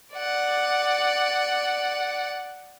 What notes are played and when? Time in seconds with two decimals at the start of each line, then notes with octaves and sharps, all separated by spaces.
0.15 D5 F#5